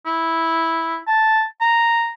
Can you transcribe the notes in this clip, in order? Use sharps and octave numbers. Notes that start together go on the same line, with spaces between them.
E4
A5
A#5